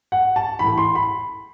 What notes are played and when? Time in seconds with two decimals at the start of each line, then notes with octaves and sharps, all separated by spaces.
0.12 F#5
0.36 A5
0.59 A2 E3 B5
0.78 C6
0.95 B5